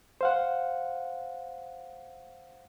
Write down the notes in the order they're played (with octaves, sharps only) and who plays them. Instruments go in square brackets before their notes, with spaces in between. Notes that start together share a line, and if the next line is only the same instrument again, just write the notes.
[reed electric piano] C5 F5 F#5